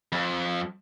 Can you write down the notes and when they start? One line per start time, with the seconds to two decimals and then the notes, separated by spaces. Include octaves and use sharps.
0.12 F2